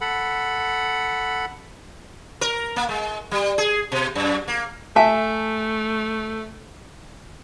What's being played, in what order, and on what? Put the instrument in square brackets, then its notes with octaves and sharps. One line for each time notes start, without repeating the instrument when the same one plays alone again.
[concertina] A4 F#5 B5
[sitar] A#4
A#3
G#3
G3
G#4
B2
F#2
A#3
[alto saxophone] A3 [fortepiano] E5 [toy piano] G#5 A5